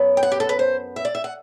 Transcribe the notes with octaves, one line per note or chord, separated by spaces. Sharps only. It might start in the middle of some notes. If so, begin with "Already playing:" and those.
Already playing: F#2 F#3 B3
G5
F#5
G4
A4
B4
C5
E5
D5
E5
F#5